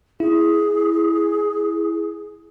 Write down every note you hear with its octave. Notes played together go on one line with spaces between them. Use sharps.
E4 G#4